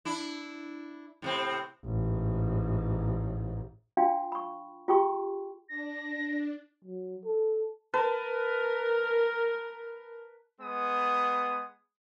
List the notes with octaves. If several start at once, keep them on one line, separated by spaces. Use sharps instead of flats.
D4 E4
A2 C3 C4
A1 G#2
D4 F4 F5 G5 C6
B5 C#6
F4 G4 G#4 G5 C6 C#6
D4 A#6
F#3
A4
A#4 B4 A5
G#3 B3 D#6